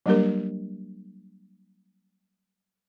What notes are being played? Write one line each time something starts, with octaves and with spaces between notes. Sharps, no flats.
F#3 G3 A#3 D4 G4 A#4